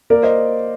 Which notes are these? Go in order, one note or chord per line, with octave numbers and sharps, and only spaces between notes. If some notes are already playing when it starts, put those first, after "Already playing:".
A#3 A#4 D5
C5 D#5